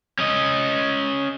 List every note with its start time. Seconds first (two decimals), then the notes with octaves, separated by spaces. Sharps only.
0.19 C#4 D#5